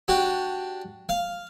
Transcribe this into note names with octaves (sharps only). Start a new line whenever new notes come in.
D4 F#4 G4
F5